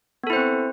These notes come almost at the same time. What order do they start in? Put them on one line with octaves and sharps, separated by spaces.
B3 A4 E4 C5 C4